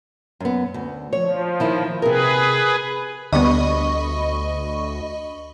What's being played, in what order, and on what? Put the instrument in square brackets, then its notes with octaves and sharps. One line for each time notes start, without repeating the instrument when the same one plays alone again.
[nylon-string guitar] F#2 B3
D2
[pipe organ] F3 [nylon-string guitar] C#5
[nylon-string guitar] D#3 E4
[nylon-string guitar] C3 A#4 [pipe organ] G#4 B4
[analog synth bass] D2 [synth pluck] D3 G3 B3 [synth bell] D#5 B5 C#6